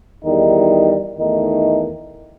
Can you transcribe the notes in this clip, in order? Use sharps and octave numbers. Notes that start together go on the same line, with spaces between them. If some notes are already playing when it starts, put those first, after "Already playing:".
E2 D#3 G3 D#4
E2 D#3 A3 D#4